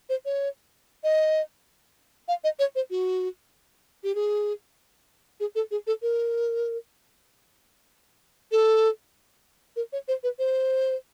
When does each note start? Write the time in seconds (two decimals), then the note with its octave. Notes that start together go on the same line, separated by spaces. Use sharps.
0.09 C5
0.25 C#5
1.04 D#5
2.28 F5
2.44 D#5
2.59 C#5
2.75 C5
2.90 F#4
4.04 G4
4.15 G#4
5.40 G#4
5.55 A4
5.71 G#4
5.87 A4
6.02 A#4
8.52 A4
9.76 A#4
9.93 C#5
10.08 C5
10.23 B4
10.39 C5